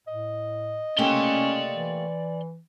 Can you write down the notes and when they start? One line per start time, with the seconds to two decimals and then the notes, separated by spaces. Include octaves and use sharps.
0.07 A2 D#5
0.99 A3 A#3 C#4 G4 D5 C6
1.72 E3